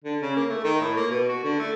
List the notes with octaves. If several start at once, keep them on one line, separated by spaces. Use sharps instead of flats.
D3
C#3
A#3
A3
D#3
A2
A#3
B2
F#4
D3
A3